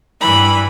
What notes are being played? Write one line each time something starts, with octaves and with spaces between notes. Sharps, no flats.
G2 E3 B5